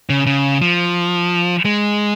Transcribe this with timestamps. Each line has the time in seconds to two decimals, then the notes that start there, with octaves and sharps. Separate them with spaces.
0.10 C#3
0.26 C#3
0.61 F3
1.65 G#3